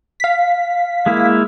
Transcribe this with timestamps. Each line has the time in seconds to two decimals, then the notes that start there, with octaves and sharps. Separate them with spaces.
0.20 F5 B6
1.06 G#3 A#3 E4